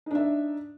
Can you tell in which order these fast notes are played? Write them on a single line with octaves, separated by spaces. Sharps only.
D#4 D4 E5